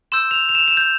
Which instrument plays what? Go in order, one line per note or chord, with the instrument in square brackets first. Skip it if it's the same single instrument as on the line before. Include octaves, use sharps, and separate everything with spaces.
[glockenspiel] C6 E6 G6 E7
F7
F7
E7
F7
E7
G6